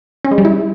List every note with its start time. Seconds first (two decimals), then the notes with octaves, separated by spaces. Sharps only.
0.25 C#4
0.31 G#3
0.38 G3
0.45 E4